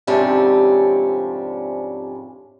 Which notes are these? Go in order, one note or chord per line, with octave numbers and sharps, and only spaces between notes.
F2 G#2 C3 G3 C#4 D4